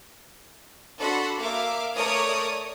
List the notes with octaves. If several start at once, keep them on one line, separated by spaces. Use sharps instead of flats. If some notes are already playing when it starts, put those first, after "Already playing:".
D4 F#4 A4 F#5 B5 C6
A#3 A#4 E5 F5 D6
A3 A#4 C#5 D5 D#6 G#6